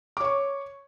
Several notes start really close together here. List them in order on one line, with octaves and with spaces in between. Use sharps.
D6 C#5 C#6